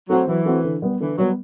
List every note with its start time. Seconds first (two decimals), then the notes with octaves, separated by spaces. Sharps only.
0.09 F#3 A3 C4 F#4 C5
0.28 E3 F#3
0.45 A3 C4 F#4 C5
0.64 D3
0.82 G3 B3
1.00 D3 E3
1.18 F#3 G3 B3